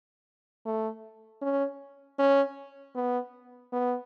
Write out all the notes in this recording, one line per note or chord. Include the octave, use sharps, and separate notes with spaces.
A3
C#4
C#4
B3
B3